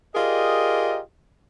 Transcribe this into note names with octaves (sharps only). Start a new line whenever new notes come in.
F4 G4 G#4 A#4 D5 D#5